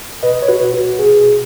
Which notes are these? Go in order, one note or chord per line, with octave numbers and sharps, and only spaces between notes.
B2 B4 D#5
C#5
F#4 B4
B2
F#4
B2 G#4